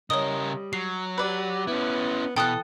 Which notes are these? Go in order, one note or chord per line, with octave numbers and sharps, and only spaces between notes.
C#3 G3 A#4 C#5 D#5 D#6
F#3 C7
G4 B4 D5
B3 C#4 E4
B2 E3 A4 G5 D#6 F#6